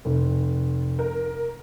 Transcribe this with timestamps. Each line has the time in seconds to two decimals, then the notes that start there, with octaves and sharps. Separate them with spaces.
0.05 F1
0.99 A#4